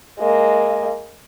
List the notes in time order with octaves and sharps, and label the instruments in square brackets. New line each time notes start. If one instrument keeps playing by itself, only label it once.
[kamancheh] G#3 A#3